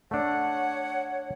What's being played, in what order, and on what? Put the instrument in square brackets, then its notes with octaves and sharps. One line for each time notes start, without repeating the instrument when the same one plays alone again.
[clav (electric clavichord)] A3 D4 [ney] C#5 [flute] F#5